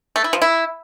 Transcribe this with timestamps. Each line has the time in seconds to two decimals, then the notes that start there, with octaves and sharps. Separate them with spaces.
0.16 A3
0.24 E4
0.33 F3
0.42 E4